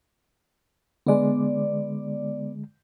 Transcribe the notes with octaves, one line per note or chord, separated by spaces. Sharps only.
D3 G#3 B3 D5